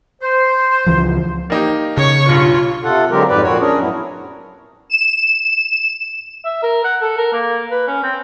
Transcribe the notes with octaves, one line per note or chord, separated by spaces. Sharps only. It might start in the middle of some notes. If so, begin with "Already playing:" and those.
C5
C#2 E3 F3
A#3 D#4 G4
C#3 C#5 C#6
B1 G2 F4
C3 F4 A4 F#5
D3 F#3 G#3 C4 G4 A#4
F2 G#2 G4 B4 D5
A#2 F3 C4 F#4 C#5
C#4 D4 G#4 A#4
F#2 A2 F#3 B3 E4
E7
E5
A#4
F#5
A4
A#4
A#3
B4
C#4
C4